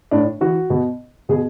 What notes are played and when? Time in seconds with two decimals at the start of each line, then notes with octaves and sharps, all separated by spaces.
0.11 A2 D4
0.41 E3 F#4
0.70 B2
1.29 B2 G#4